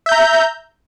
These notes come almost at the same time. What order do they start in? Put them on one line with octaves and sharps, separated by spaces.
E5 G6 A#5